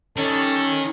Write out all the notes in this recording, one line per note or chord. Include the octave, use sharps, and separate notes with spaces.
D#3 G3 C#4 A4